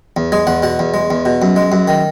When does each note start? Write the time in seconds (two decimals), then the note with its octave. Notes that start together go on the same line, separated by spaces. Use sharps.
0.17 E2
0.32 G#3 G#4
0.47 E2 F#5
0.63 B2 F#5
0.79 E2
0.94 G#3
1.10 E2
1.25 B2
1.42 F#2
1.56 G#3
1.72 F#2
1.88 D#3